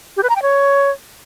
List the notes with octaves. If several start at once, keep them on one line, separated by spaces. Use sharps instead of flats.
G4
B4
A#5
G5
C#5